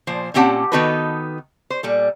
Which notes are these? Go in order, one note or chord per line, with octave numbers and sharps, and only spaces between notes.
A#2 F3 C5
A#2 C4 C#4 G4 F#5 A5
D#3 B3 D#4 F#4 A4 B4
C5
A#2 G3 A4